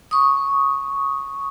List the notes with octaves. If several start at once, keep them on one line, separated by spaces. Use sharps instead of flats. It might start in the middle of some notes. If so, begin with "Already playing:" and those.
C#6 D#6